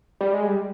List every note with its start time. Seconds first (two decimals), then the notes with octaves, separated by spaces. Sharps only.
0.21 G3
0.34 G#3
0.47 G3